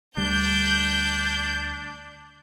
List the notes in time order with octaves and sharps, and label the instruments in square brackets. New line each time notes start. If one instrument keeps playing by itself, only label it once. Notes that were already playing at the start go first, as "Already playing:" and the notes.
[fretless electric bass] D2 G3 [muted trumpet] D4 [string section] G6